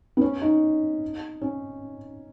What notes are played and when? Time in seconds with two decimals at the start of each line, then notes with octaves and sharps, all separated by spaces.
0.17 B3
0.21 C#4
0.41 D#4
1.41 C#4